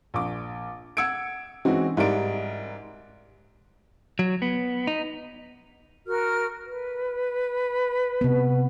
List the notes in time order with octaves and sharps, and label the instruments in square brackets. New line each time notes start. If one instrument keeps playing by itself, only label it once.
[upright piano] A#1 D6
F#5 E6 G#6 C#7 D7
E3 G#3 C4 C#4 D#4 F#4
G#2 G3 E4 A#4 D5 D7
[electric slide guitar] F#3
B3
D#4
[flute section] F#4 A#4 F6
B4
[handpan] C3 B3